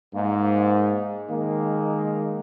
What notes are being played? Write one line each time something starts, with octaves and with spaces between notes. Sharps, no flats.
G#2 A#3
D#3 G#3 A#3